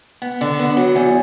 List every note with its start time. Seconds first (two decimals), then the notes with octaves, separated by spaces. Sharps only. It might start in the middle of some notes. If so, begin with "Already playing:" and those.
0.22 B3
0.41 D3
0.59 B3
0.77 F#3
0.96 E2